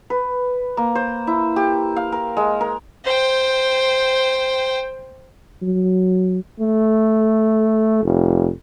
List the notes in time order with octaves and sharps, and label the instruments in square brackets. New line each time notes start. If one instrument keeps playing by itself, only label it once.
[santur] B4
A#3
C5
E4
G4
F5
A#4
G#3
A#4
[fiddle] C5 G5
[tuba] F#3
[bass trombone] A3
F1